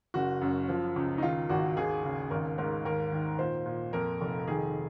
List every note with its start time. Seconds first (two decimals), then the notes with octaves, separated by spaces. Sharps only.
0.14 F#1 F#4
0.42 F#2
0.69 F3
0.96 C#2
1.18 D#4
1.22 D#3 F4
1.49 G#1 F#4
1.77 D#2 G#4
2.03 C#3
2.30 G#1 A#4
2.58 G#2 A#4
2.85 D#2 A#4
3.12 D#3
3.39 A#2 C5
3.66 A#2
3.93 F2 A#4
4.21 F1
4.48 D#3 G#4